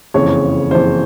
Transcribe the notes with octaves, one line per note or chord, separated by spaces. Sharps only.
F#1 F2 C#3 E3 C#5
F#1 F2 C#3 E3 C5